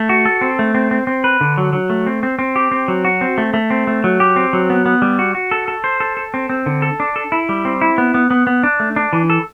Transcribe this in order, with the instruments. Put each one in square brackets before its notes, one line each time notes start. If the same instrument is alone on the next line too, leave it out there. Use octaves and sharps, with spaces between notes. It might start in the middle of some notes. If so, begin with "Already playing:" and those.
Already playing: [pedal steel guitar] A3
F#4
A4
C4
A3
C4
C4
C4
B4
D3
F#3
F#3
A3
C4
C4
C4
G4
C4
F#3
F#4
C4
A3
A3
C4
A3
F#3
G4
C4
F#3
B3
B3
G3
F#4
F#4
A4
A4
C5
A4
A4
C4
C4
D3
A4
D4
A4
E4
G3
C4
E4
B3
B3
B3
B3
D4
A3
D4
E3
A4